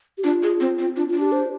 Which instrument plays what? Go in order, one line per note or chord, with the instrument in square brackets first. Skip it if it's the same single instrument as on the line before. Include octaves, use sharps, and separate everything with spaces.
[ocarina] G4
[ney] D4 [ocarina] F4
[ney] G#4
C4
C4
[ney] D4 [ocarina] F4
[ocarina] F4
[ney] D4
[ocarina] G4
C5